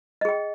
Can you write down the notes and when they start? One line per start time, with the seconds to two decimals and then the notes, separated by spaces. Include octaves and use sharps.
0.21 D#5
0.25 G#4
0.29 G5